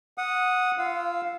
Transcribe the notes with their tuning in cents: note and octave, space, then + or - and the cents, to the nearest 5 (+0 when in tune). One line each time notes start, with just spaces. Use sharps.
F#5 -10 D#6 +0
F4 -25 F5 +0 E6 +0